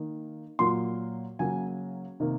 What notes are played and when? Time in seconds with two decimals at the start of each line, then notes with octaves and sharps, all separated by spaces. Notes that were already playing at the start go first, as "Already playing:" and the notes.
Already playing: D#3 A#3
0.59 A#2 F#3 A#3 C6
1.39 C#3 F#3 A#3 G#5
2.20 C3 D#3 A#3